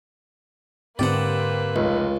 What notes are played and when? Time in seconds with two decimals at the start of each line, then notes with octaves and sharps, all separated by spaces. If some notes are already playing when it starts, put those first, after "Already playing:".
0.99 G#2 D3 A#3 C4 G4 B4 D5 F#5
1.76 F1 C#2 D#4